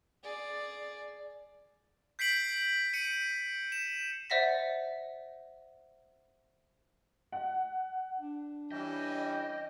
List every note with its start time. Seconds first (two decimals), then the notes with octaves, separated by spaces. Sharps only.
0.23 G#4 D5
2.19 G6 B6 C7 D7 F#7
2.94 C#7 D#7
3.72 E7
4.30 C5 D5 E5 F#5 A#6 B6
7.32 F#5
8.19 D4
8.72 E3 G3 C#4 D#5 G5